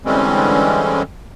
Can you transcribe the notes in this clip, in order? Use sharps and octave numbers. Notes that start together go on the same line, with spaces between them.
D3 E3 G3 G#3 C4 C#4